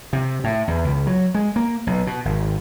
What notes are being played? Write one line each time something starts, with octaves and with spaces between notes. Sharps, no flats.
C3
A2
E2
C#2
F#3
G#3
A#3
B1
B2
G#1